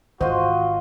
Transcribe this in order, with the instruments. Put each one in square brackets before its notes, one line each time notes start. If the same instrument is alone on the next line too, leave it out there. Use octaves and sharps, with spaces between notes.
[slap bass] G#1 [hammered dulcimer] F4 D#5 [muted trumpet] F#4 [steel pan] C5